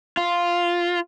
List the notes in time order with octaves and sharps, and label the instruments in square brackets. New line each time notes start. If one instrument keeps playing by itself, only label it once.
[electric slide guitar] F4